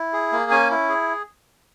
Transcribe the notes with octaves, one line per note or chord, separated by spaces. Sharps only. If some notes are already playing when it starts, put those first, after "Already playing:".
Already playing: E4
G#4
A#3
C#4 G#5
E4
G#4